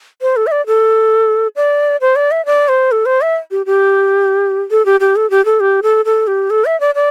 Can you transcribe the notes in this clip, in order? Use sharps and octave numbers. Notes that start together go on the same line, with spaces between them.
C5
A4
E5
D5
A4
D5
C5
D5
E5
D5
C5
A4
C5
E5
G4
G4
A4
G4
G4
A4
G4
A4
G4
A4
A4
G4
A4
E5
D5
D5